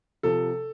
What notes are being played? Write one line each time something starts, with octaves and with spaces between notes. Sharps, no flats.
C3 F3 A4